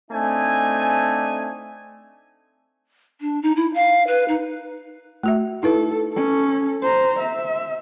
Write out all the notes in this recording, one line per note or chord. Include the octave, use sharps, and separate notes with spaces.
A3 C4 D4 D#4 G#5
D4
D#4
E4
F5
B4
D#4
A3 F#4 E5
D#4 E4 A4 B4
C#4 A4
C5 A#5
E5